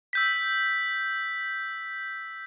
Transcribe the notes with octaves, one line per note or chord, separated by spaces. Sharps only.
E6 G6 B6